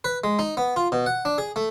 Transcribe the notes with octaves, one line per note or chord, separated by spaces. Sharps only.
B4
G#3
D#4
B3
F4
B2
F#5
D4
G#4
A3